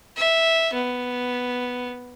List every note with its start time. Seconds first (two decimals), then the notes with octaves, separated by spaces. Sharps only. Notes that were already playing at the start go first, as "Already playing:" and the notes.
0.17 E5
0.74 B3